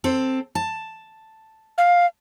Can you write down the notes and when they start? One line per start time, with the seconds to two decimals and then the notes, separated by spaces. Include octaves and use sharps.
0.04 C4 A4
0.55 A5
1.78 F5